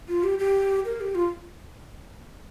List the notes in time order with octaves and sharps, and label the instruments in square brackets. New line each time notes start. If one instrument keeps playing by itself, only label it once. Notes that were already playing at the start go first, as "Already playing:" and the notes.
[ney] F4
G4
G4
A#4
G4
F4